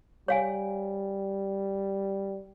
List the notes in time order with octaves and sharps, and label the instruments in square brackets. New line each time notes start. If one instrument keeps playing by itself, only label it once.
[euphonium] G3 [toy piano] C#5 F5 G#5